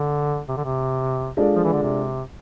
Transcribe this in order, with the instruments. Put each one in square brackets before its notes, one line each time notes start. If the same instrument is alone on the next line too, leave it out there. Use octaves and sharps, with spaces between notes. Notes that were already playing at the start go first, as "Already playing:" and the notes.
Already playing: [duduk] D3
C3
D3
C3
[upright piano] G#3 D4 F4 A4 D5
[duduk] F3
E3
D3
C3